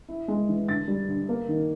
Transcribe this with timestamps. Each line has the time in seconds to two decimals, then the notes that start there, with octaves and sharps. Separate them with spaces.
0.08 E4
0.28 G#3
0.49 E3
0.69 D3 A6
0.88 G3
1.09 D3
1.29 A#3
1.48 D#3